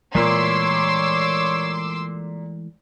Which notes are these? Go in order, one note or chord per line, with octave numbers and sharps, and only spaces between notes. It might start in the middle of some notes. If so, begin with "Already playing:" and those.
A#2 E3 G#3 A3 C#5 C6 D6 E6